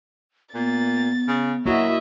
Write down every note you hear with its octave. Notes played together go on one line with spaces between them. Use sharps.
A#2 B3 A6
C#3
F#3 A#3 E4 F#4 D#5 E5